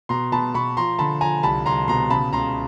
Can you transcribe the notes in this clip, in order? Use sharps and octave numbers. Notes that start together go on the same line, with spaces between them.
B2 A#5 C6
B2 A5 B5
B2 B5 C#6
F3 A#5 C6
D3 A5 B5
F3 G#5 A#5
C2 A5 B5
C2 A#5 C6
B2 A#5 C6
C#3 A5 B5
C#2 A#5 C6